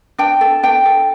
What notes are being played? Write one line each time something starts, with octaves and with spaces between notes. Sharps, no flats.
D4 G5
A4
D4 G5
A4